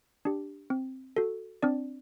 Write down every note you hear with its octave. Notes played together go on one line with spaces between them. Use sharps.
D4 G4
C4
F#4 A4
C4 D4 D5